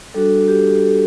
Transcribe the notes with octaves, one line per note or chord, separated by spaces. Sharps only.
G3 D4 F#4 A4
G4
A4